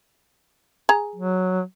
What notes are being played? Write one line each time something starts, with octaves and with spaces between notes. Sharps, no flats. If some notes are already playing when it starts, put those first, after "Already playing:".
G#4 A#5
F#3